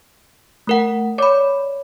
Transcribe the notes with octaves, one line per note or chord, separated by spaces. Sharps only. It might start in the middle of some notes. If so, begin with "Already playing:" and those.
A3 A#4 F#5
C#5 D5 B5 D6